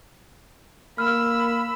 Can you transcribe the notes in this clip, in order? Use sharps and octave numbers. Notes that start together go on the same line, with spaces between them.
A#3 B5 E6 F6